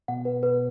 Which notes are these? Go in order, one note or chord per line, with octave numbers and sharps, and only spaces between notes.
B2 F#5
B4
B4